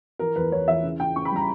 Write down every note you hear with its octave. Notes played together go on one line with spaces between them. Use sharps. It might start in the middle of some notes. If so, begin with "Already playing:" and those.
E3 A#4
E2 B4
E2 C#5
E3 E5
C#3
C#3 G5
C#3 C#6
B5
G3 A#5